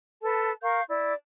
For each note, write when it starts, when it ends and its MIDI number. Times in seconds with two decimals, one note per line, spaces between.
0.22 0.51 69
0.22 0.51 71
0.22 0.51 81
0.62 0.81 70
0.62 0.81 77
0.62 0.81 85
0.62 0.81 91
0.88 1.13 64
0.88 1.13 74